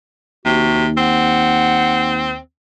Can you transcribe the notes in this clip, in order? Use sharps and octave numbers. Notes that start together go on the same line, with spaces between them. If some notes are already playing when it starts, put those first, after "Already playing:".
D#2 C3 F#4
C4 F#5